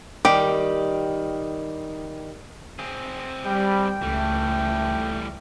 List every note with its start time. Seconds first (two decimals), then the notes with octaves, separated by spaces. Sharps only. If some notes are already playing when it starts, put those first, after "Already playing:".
0.25 D#3 G3 G4
2.79 C4 G#4
3.45 G3 G5
4.02 C#2 E3 G3 A3